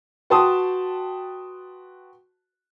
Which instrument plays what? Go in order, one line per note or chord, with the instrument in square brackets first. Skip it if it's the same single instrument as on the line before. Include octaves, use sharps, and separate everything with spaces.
[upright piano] F#4 B4 G5 A5 C6 D#6